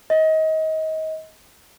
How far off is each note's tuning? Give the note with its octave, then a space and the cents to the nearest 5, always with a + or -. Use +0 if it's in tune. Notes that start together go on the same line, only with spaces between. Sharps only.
D#5 +25